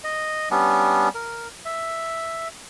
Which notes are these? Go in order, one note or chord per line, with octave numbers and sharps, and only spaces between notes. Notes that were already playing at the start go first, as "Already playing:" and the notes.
D#5
G3 B3 C#4 D4
A#4
E5